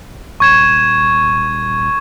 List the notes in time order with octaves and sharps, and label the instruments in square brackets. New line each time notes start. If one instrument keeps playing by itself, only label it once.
[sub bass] D#1 [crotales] C#6 G#6 E7